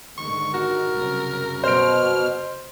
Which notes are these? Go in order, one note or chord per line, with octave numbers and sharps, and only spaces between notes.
G#2 D3 D#3 C#6
F#4 A#4
C2 F#2 C#3
B2 C5 F6 D7